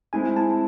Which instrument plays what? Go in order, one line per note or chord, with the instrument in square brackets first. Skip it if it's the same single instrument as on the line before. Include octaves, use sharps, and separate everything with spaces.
[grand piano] G#3 C4 E4 [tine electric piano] G#5
[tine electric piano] A5